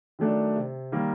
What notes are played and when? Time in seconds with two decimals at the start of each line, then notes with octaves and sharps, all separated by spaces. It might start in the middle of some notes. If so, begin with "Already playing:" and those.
0.19 D#3 F#3 A3 D4
0.56 C3
0.92 D#3 G3 A#3